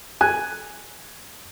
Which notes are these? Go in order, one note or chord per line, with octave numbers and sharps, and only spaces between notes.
G#5 F#6